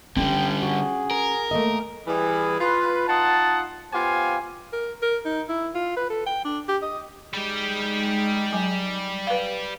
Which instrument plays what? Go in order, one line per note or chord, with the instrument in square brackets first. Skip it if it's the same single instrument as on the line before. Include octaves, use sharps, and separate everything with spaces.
[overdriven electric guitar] D3 G3 [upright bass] C#4 [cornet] G5
[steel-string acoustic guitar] F#4 [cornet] G#4
[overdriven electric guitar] A#4
[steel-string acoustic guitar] A3 A#3 D#5
[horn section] E3 G3 G#4
F4 B4
D#4 F4 D#5 F#5 A5
B3 F4 G4 C5 F5 G#5
[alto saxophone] A#4
A#4
D#4
E4
F4
B4
A4
G5
D4
G4
D#5
[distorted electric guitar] G3 G4 [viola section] G#3 D#4
[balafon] F#3 G#5 D6
B4 F5